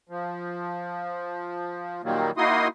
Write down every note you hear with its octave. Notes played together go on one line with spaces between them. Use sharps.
F3
A#2 D#3 F#3 G3 A#3
A#3 D#4 E4 F#4 C6 D#6